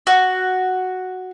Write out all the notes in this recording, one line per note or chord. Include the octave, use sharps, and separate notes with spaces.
F#4